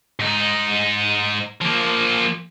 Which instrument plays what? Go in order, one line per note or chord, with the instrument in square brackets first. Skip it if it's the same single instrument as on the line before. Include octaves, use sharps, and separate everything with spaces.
[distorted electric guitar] G#2 D#4
F3 A#3